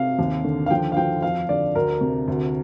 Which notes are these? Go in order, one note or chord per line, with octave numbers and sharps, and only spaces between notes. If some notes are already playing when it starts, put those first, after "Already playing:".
Already playing: C3 F5
D#2
D3
F5
F3 G5
F5
F3 G5
F2 F5
D3 D5
D2 A#4
C3
D2